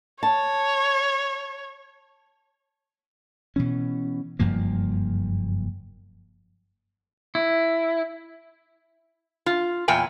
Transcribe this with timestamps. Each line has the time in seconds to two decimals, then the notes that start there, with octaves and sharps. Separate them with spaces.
0.23 C#5 A5
3.56 B2 E3 C#4
4.39 F#1 G2 F3 A#3
7.35 E4
9.46 F4
9.88 E2 A#2 G5 G#5